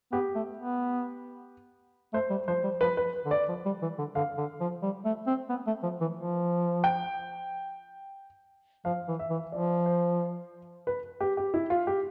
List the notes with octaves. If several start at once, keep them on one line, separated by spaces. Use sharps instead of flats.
B3 G4
A3
B3
A3 C5
G3
F3 C5
G3
F3 B4
B4
D3
D5
F3
G3
E3
D3
D3 F5
D3
F3
G3
A3
C4
B3
A3
F3
E3
F3
G5
F3 F5
E3
E5
E3
F3 D5
C5
B4
G4
G4
E4
F4
G4